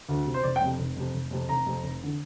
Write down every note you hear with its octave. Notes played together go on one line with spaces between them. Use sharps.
D2
C3
C5
F1 D5
G5
F2 C3
F1
F2 C3
F1
F2 C3
F1 A#5
F2 C3
F1
D3